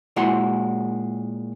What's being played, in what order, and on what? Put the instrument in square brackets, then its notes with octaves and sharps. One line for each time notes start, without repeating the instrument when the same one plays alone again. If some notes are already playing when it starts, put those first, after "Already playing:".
[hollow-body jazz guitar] A#2 G#3 E4 F#4 F#5 C6